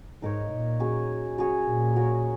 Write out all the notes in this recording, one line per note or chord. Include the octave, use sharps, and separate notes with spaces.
G#2 D#4 A#4 C#5
A#2
F#3 C#4 G#4
F#3 C#4 G#4 C#5
A#2
C#4 F#4 A#4 C#5